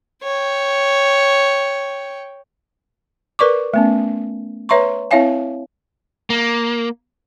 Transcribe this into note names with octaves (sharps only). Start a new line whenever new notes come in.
C#5 G5
A#4 B4 D5 C#6 D6
A3 B3 C#4
B4 C#5 E5 A#5 C6 C#6
C4 E4 C#5 E5 F5 G#5
A#3